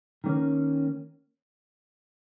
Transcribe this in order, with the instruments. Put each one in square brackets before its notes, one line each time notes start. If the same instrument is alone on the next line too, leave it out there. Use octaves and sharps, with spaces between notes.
[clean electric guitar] D#3 A#3 C#4